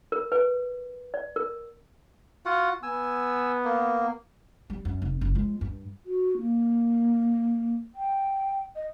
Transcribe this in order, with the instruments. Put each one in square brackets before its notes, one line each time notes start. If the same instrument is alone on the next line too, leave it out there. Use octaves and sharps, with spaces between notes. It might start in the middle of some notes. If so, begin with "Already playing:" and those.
[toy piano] A#4
B4
D5
A#4
[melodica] F4 F#4 F#5
[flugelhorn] B3 [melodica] G#5 E6
[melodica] A#3
[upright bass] G3
F#2
F1
F#1
F3 G#3
G2
[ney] F#4
A#3
G5
D#5